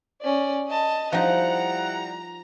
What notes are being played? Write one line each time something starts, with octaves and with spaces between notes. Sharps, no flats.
C#4 D5
D#5 A5
F3 G3 D#4 E4 F#5 A#5